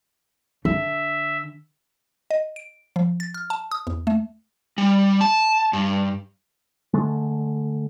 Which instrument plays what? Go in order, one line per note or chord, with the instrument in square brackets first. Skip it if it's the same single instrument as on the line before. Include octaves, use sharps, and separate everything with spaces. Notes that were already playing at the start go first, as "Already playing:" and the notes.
[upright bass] D3 [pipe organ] E5
[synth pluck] D#5
D7
F3
A6
F6
A5
D#6
E2
A3
[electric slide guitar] G3
A5
G2
[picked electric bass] D3 G#3 A3